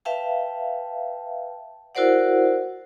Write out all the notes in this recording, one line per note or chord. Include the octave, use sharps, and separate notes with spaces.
B4 E5 F5 G5 A5
E4 F#4 A#4 C5 D5 F#5